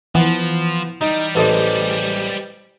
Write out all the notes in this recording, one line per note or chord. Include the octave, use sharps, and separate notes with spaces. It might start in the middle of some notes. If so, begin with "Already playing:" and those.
E3 F3 B3
G3 D#4
A1 G3 G#3 A4 B4 C5 D#5 D#6